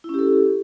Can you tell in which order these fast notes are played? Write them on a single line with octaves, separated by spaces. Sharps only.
E4 C#4 G4 A4